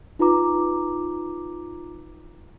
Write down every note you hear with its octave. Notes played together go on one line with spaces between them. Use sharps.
D#4 F4 B4 A#5 D6